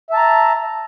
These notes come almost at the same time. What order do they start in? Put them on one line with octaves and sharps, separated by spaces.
E5 A5 A#5